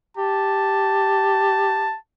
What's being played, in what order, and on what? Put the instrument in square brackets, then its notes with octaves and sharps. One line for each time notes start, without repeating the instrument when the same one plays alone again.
[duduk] G4 [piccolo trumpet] A5